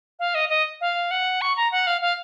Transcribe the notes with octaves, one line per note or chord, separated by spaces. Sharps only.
F5
D#5
D#5
F5
F#5
C#6
A#5
F#5
F5
F5